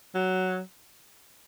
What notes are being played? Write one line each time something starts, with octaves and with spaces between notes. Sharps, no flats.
F#3